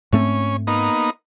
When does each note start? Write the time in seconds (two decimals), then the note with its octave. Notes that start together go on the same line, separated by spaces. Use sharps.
0.13 G#2 A3 C4 C#4
0.67 A#3 B3 D#4